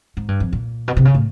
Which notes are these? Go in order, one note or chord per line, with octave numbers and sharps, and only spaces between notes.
G#2
G2
F2
A#2
B2
C3
C#3
A2